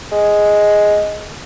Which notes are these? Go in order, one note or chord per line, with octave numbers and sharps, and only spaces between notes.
G#3